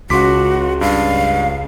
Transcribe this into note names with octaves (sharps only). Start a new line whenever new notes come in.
C#2 C#3 F#4 C6 D6 B6
G2 F5